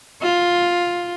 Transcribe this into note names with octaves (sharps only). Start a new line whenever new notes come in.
F4